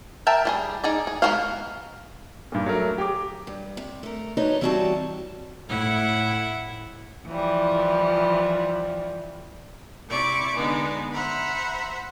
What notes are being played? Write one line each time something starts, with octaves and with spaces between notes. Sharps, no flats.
A#4 E5 G5 A5
G3 F4 G#4
D#4 G#4 D5
G#4
G#3 B3 F#4 A#4 F5
G2 A#2
F#3 A3 A#4
G4 G#4 D6
G2
C3
A3 A#4
D4 D#4 F#4 B4 C#5 D#5
E3 G3 C4 F#4 G4 A5
A2 E4 F#5
E3 F3 G3
C3 E4 D5 C#6 D6
D3 G#3 B3 D#4
C5 E5 F#5 A#5 B5